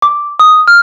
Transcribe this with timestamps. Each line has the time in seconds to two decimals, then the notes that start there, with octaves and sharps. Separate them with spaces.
0.02 D6
0.39 D#6
0.68 F6